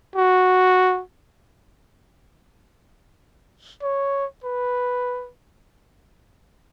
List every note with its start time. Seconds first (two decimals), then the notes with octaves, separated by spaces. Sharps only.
0.16 F#4
3.82 C#5
4.44 B4